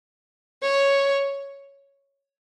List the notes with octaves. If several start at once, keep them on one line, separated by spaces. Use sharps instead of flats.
C#5